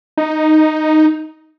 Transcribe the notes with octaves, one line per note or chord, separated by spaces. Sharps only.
D#4